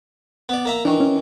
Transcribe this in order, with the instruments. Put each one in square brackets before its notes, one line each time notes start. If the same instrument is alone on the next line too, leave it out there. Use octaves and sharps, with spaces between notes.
[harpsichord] B3 D5
A#3 E5 A#5
[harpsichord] D#3 E3 [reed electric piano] D4
[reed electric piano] C#4